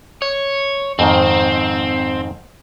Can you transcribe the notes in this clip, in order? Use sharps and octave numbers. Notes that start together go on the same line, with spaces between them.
C#5
F2 G#2 D#3 C4